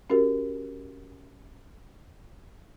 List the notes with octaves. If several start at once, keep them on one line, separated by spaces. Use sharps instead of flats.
C#4 F#4 G4 A#4